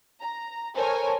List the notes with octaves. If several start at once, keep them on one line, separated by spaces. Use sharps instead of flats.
A#5
A4 A#4 C5 C#5 G#5